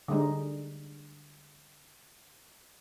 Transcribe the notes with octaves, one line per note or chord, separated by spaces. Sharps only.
D3 G3 G#3 D#4